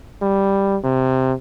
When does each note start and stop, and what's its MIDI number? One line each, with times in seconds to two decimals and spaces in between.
0.22 0.77 55
0.84 1.33 48